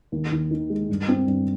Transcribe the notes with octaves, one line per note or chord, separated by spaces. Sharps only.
D#2
D#2
D#3
G#3
G2
C4
G2